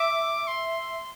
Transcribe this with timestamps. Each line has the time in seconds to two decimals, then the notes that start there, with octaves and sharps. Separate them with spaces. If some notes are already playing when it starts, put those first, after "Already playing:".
Already playing: E5 D6
0.47 C6